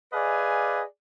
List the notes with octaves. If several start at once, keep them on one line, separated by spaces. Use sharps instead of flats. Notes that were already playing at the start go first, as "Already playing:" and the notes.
G#4 B4 D5 D#5 F5 G#5